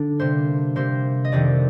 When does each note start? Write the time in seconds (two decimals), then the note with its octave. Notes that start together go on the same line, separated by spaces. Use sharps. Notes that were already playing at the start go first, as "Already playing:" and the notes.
Already playing: D3 D4
0.20 C3 G3 A#3 C5
0.76 C3 G3 A#3 C5
1.25 D#5
1.32 F2 C3 D#3 G3 D5